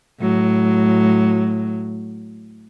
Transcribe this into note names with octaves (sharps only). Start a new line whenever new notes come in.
A2 F#3